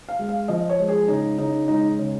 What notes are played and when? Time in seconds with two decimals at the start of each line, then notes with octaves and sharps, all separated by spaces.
0.09 F5
0.19 G#3
0.29 F5
0.48 F3 D#5
0.69 C#5
0.79 G#3
0.88 G#4
1.08 C#3 D#4
1.38 C#3 D#4
1.68 G#3 D#4
1.98 C#3